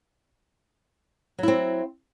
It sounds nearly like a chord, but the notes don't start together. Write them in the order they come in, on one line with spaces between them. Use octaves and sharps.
F#3 E4 C4